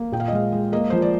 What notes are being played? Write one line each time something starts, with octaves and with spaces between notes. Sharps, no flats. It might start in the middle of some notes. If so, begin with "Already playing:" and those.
Already playing: A#3
A#2 G5
F5
D#5
G#3 F5
G#3
A#3 D#5
F3 C5
D5